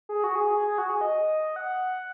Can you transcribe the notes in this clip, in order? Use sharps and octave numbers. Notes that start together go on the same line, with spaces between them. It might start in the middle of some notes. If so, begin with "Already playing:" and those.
G#4
F#4
G#4
G#4
G#4
G#4
F#4
G#4
D#5
F#5